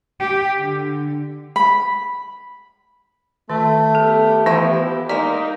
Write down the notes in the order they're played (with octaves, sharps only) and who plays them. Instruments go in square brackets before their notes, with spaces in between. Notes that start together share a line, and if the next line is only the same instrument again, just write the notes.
[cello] G4
D3
[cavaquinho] B5
[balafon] D#3 [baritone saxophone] A3
[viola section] B3 G4 [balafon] A4
[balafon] E3 [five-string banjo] F3 E4
[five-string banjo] G#3 A#3 [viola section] D#4 A#4 D#5 [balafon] D5